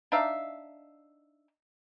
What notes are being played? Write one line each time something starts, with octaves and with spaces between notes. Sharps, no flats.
D4 D#4 E5 F5